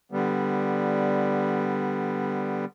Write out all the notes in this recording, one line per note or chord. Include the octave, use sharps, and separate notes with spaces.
D3 G3 B3